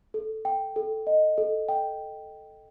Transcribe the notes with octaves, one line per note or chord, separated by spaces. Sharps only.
A4
G5
A4
D#5
A4
G5